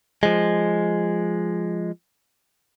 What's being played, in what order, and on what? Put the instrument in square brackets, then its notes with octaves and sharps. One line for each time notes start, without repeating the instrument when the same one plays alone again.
[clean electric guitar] F3 G#3